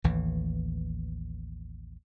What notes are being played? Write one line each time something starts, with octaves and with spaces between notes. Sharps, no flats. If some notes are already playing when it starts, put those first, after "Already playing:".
A1 D#2 E3